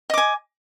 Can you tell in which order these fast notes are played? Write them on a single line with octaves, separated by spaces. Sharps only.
D#5 D6 G#5